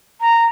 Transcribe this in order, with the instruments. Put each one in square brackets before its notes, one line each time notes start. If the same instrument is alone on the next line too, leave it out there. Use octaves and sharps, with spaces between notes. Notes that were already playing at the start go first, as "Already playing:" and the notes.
[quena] A#5